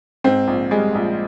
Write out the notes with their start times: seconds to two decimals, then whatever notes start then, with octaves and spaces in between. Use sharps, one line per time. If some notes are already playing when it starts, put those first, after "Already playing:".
0.24 G#2 C4
0.48 A#1
0.71 G3 G#3
0.95 A#1